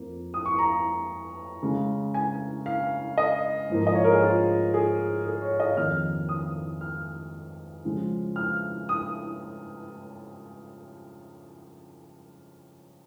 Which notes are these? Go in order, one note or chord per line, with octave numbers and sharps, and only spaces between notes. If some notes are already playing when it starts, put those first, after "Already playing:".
Already playing: F2 F3 A#3
D#6
C#6
A#5
C#3 G#3
G#5
F5
D#5
G#2 F3 A#3
D#5
C#5
A#4
G#4
F4
G#4
G#4
C#5
D#5
F2 D#3 A#3 F6
D#6
F6
C#3 F3 G#3
F6
D#6